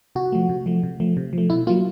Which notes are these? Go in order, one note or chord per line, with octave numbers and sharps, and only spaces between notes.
C3 F#4
F3 A3
C3
F3 A3
C3
F3 A3
C3
F3 A3
B2 E4
F#3 A#3 F4